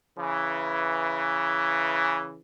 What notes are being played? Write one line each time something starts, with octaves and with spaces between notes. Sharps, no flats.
C#3 E3